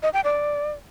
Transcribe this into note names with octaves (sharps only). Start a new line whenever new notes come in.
D#5
G5
D5